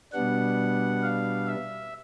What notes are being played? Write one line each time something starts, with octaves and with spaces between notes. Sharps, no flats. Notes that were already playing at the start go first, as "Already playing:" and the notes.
B2 G3 B3 D4 F#5
F5
E5